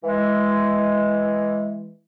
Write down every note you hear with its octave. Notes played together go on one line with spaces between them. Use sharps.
E3 G#3